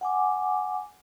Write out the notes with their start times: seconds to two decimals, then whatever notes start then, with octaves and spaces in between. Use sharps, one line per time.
0.01 F#5 G#5 D6